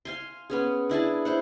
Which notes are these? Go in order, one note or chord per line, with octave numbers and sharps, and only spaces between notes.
F5 G#5 C6
B3 C#4 G#4
D4 E4 G#4 A5
E4 C5 F#5